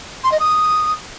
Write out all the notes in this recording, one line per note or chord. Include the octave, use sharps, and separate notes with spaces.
C6
D#5
D#6